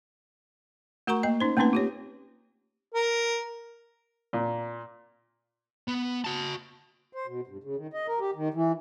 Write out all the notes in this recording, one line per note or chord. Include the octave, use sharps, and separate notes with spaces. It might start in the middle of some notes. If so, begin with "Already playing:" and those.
A3 F#4 A#4 F#5 A#5 C#6
A#3 D#5
C#4 D#4 C5
A3 A#3 C4 C#4 D#4 B4
F4 G4 C#5
A#4
A#2
B3
F#4 A5
C5
B2
G2
C#3
D#3
D#5
A#4
G4
D#3
E3